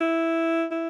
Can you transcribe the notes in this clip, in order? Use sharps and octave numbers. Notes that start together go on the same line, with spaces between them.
E4
E4